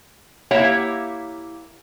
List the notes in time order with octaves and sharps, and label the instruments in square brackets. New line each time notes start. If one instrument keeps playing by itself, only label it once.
[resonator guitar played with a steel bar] A#3 E4 G4 C#5 E5 F#5